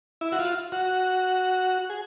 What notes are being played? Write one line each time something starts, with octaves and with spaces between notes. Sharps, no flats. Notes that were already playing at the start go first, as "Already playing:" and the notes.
E4
F#4
F4
F#4
G#4